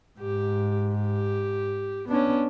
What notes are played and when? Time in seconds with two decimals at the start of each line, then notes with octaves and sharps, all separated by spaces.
0.20 G#2 G4
0.95 G4
2.09 B3 C#4 D4